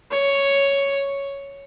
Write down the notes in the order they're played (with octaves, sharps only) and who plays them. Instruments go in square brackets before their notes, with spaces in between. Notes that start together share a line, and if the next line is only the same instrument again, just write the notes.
[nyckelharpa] C#5